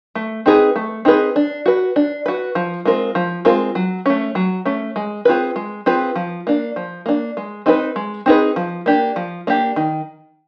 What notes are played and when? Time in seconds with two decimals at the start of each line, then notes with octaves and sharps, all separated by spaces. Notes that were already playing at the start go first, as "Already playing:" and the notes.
0.15 A3
0.46 C4 D#4 G#4 B4
0.76 A3
1.05 C4 D#4 G#4 B4
1.36 D4
1.66 F#4 B4
1.96 D4
2.26 F#4 B4
2.55 F3
2.85 G#3 C4 F4 A#4
3.15 F3
3.45 G#3 C4 F4 A#4
3.75 F#3
4.06 A3 C#4
4.35 F#3
4.65 A3 C#4
4.96 G#3
5.25 C4 F4 G#4 B4
5.56 G#3
5.86 C4 F4 G#4 B4
6.15 F3
6.47 A#3 D4
6.76 F3
7.06 A#3 D4
7.37 G#3
7.66 C4 D#4 G#4 B4
7.96 G#3
8.26 C4 D#4 G#4 B4
8.56 F3
8.86 A#3 D4 G4
9.16 F3
9.47 A#3 D4 G4
9.76 D#3